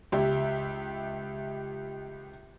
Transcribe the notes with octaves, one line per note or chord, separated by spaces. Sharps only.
C#2 G4 E5